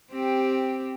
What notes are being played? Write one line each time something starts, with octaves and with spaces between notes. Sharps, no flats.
C4 G4